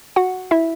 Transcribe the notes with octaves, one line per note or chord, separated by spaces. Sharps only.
F#4 F#5
E4 E5